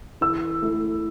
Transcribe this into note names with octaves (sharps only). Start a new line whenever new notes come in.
E3 E6
A3 E4